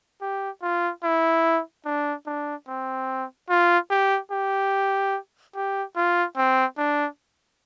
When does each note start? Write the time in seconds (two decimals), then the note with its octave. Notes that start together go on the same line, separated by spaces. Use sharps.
0.21 G4
0.62 F4
1.04 E4
1.85 D4
2.26 D4
2.68 C4
3.49 F4
3.90 G4
4.32 G4
5.55 G4
5.96 F4
6.37 C4
6.78 D4